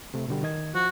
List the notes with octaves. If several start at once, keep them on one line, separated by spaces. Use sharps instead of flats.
C3 A3
B2 D3 G3
D#3 D#5 G#6
F3 F#4